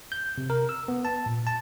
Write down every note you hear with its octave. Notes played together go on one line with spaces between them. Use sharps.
G6
C3
A#4
E6
B3
A5
A#2
A5